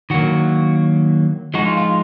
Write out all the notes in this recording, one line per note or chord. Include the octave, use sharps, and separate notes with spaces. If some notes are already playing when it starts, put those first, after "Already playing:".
D#3 F#3 A#3 F#4
F3 G#3 D#4 F#4
F4
F4